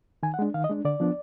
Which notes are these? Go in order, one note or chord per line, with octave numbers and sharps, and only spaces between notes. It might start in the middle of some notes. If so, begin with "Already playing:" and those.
D#3 G#5
F#5
G#3 D4
D#3 F5
D#5
G#3 D4
D3 D5
F3 B3 D4